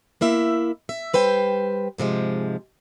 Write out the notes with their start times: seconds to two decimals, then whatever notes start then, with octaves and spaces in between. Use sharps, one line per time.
0.21 A#3 E4 E5
0.89 E5
1.13 G3 B4 C5 G5
1.98 G#2 C3 F3 G#3